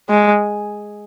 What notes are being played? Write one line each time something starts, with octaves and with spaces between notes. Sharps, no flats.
G#3